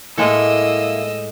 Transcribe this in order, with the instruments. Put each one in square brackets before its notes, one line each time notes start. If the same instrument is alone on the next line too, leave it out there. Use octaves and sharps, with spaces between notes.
[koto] A2 G#3 A4 [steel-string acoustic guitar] A#3 E4 [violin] D#5 E6